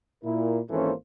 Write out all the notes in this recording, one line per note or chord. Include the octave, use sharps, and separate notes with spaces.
A#2 E4 A#4
G#1 E3 A#3 C#4 A4 C5